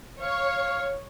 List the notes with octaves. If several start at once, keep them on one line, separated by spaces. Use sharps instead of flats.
C#5 F5